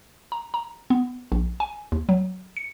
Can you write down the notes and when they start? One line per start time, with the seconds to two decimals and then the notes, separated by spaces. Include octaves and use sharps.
0.32 A#5
0.54 A#5
0.90 B3
1.32 A#1
1.60 G#5
1.92 D#2
2.09 F#3
2.57 C#7